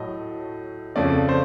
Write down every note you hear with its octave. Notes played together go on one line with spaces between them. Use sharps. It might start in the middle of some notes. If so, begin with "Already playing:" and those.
Already playing: A2 F#3 A3 D#5
F2 C#3 F3 A3 C#4 D5
C5